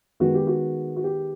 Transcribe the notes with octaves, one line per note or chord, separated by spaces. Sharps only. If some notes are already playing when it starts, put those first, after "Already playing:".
D#3 G#3 B3 F#4
G4
F#4
F#4
G4